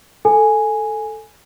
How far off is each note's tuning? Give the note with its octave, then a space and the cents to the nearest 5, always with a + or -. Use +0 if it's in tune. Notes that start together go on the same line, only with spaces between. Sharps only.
A4 +0 G#5 +0